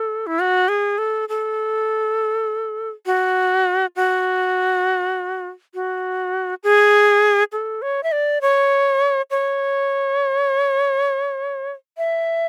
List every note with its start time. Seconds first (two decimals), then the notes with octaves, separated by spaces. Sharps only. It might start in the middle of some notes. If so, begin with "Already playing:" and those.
Already playing: A4
0.27 E4
0.40 F#4
0.68 G#4
0.98 A4
1.29 A4
3.06 F#4
3.96 F#4
5.74 F#4
6.63 G#4
7.52 A4
7.82 C#5
8.03 E5
8.12 D5
8.42 C#5
9.31 C#5
11.98 E5